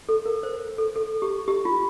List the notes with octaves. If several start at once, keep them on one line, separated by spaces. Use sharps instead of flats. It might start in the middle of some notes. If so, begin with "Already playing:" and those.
A4
A#4
C5
A4
A4
G4
G4
F4